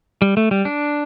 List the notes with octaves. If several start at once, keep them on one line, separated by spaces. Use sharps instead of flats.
G3
A3
G3
D4